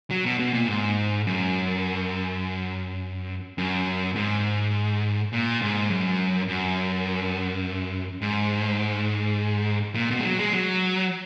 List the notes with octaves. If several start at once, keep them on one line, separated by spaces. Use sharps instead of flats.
F#3
B2
B2
A#2
G#2
F#2
F#2
G#2
A#2
G#2
F#2
F#2
G#2
A#2
B2
G#3
F#3
G#3
F#3